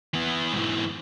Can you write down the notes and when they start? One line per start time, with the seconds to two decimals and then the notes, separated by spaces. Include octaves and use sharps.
0.14 E3 B3
0.53 G#2 E3